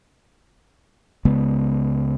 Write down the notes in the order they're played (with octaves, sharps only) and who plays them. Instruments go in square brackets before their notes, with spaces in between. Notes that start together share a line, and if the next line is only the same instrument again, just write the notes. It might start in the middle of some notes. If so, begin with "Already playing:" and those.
[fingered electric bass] C#2 C#3 G#3 B3